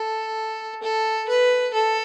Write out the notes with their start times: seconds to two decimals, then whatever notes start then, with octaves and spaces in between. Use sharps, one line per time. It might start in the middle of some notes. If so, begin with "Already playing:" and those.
Already playing: A4
0.83 A4
1.28 B4
1.74 A4